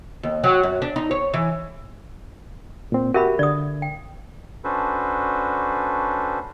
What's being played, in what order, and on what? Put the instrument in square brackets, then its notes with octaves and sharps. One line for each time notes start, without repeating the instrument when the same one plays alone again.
[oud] D#2
F#3
F#2
D4
D#4
C#5
E3
[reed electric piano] A#2 C4
[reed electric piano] F#4 G4 [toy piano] A#4 E5 B5
[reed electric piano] D3 [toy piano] D5 D#6
[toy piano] G5
[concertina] C#4 D4 F#4 A4 B4 C5